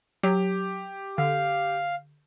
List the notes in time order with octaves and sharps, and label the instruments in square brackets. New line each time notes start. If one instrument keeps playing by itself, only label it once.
[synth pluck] F#3 [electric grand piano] G4
[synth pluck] D3 [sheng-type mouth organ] F5